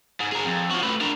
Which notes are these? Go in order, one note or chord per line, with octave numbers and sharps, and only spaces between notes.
G#2
G#4 A#4
F2
F3 F#4
A3 B4
D4 A#4